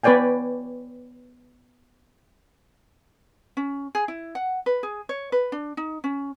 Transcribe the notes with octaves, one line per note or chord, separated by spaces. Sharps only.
B3 B4 C#5 D5 G5 G#5
C#4
G#4
E4
F#5
B4
G#4
C#5
B4
D4
D#4
C#4